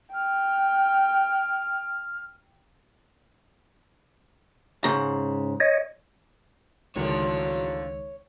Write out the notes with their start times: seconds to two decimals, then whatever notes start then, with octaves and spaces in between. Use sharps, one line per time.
0.14 G5 F6
4.84 G#2 C#3 A#5
5.60 C#5 D#5
6.96 C#2 A2 D3 D#3 F3 F#3 G#3 C#5